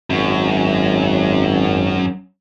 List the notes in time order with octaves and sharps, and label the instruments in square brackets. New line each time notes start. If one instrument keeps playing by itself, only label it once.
[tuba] G#1 [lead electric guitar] F#2